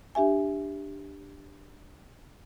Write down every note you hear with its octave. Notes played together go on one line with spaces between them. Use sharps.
D4 G4 E5 G#5